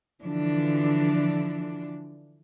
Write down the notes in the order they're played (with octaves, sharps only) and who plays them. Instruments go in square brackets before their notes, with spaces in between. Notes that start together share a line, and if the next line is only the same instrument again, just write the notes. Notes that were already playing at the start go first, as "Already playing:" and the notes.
[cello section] D3 E3 F3 D4